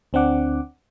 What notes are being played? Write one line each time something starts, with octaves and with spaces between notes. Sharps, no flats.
D2 C4 D4 F#5 D6